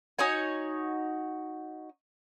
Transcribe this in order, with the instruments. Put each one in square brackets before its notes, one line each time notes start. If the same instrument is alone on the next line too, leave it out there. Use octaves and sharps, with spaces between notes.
[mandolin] D#4 F#4 C#5 G#5